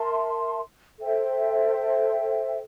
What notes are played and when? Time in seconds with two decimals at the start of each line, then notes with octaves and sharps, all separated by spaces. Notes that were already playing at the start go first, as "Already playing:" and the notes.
Already playing: A#4 E5 A5 C6
0.99 A4 C5 E5 G5